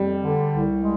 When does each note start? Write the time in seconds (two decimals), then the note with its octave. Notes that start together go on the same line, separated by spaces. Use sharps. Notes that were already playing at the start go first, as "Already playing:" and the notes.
Already playing: F2 G3
0.20 D3
0.50 C2
0.79 G#3